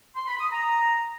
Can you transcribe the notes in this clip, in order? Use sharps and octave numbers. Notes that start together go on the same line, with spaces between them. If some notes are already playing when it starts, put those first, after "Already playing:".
C6
B5
D#6
A#5